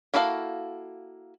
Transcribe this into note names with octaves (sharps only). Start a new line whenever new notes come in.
A#3 E4 F#4 A4 F5